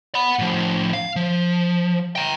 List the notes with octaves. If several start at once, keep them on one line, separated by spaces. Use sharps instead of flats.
F#5 B5
A2 F3
F5
F3
G5 A#5